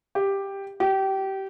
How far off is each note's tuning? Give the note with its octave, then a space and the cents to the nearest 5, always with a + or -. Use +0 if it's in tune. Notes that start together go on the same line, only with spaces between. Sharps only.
G4 +5
G4 -25